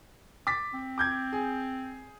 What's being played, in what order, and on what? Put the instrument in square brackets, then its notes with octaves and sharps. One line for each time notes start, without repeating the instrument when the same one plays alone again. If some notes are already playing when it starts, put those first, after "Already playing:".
[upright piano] D6 A6 B6
[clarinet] C4
[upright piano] D6 G6 G#6
G#4